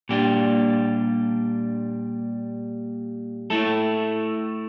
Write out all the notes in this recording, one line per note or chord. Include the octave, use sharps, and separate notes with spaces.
A#2 G3 D4 G4
A3 E4 A4